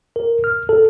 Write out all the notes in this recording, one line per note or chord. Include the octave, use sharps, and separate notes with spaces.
A#4
F6
A4